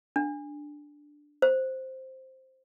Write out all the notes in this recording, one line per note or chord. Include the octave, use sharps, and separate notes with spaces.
D4
C5